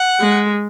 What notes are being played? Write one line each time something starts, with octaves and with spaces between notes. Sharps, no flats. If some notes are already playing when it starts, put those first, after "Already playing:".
Already playing: F#5
G#3